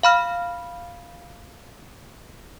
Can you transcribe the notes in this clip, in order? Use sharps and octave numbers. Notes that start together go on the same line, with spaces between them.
F5 B5 F6